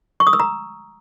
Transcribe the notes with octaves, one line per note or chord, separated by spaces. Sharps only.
C#6
D#6
E6
A#5